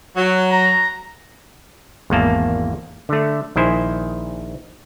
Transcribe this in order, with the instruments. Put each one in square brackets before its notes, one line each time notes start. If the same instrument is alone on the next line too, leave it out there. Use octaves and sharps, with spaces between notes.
[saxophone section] F#3
[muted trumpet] A#5
[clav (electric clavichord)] G#1 E2 A#3 A5
D3 A3
A#1 D#3 E4 C5 G#5